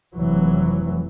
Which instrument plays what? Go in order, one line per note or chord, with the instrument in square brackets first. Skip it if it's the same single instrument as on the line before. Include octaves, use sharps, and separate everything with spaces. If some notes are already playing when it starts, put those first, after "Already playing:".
[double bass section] F1 E3 [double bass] F#3